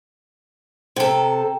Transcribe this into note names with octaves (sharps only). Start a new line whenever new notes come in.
C3 A4 G5 A#5